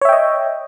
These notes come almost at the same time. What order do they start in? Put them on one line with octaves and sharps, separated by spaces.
C#5 E5 G5 D#5